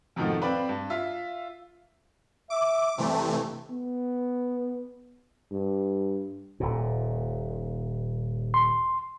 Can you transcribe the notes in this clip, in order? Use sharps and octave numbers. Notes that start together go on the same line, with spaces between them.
F2 G#2 B2 D#3 F3 A3
C4 B4 D5 F5 B5
G2
F4 E5 F5
E5 D6
G2 C3 E3 A3
B3
G2
D#1 A#2
C6